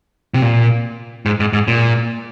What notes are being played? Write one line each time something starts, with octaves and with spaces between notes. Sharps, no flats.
C3
A#2
G#2
G#2
G#2
A#2